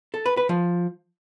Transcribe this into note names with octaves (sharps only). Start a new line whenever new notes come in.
A4
B4
B4
F3